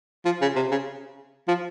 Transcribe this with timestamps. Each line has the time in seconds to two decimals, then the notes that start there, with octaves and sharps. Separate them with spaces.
0.25 F3
0.42 C#3
0.56 C3
0.71 C#3
1.48 F3